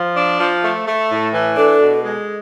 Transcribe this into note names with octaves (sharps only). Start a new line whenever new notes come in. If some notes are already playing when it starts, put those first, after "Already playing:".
Already playing: F3
D4
F3
A3
A3
A2
E3
D4 A4
B2
G#3